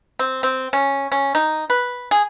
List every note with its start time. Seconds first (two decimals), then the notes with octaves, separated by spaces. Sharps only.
0.19 C4
0.43 C4
0.73 C#4
1.12 C#4
1.35 D#4
1.70 B4
2.11 G#4